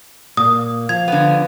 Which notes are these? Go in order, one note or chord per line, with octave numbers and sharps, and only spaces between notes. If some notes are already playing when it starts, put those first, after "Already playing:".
A#2 A#3 D#6
F3 F5 G#6
D3 B3